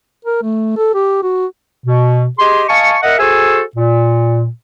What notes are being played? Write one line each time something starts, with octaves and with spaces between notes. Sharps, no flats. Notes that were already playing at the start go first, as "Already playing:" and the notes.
A#4
A3
A4
G4
F#4
B2
G4 G#4 D#5 C6
D#5 F5 G#5 A5 C#6
A#4 D#5 E5 F#5
F#4 G#4 A4 C5 G#5 E6
A#2